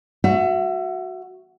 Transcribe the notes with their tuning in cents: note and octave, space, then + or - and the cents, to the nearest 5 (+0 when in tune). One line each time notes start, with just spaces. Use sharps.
F#4 +0 E5 +30